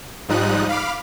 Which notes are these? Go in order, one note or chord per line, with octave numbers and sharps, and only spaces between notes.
G#2 F3 G3 D#4 D#6 F#6
F5 B5 D6 F6